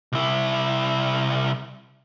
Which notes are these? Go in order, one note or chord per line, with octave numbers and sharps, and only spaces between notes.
C2 E4